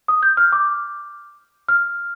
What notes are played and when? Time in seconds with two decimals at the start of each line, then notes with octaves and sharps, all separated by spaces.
0.08 D#6
0.23 G6
0.37 F6
0.52 D6
1.68 F6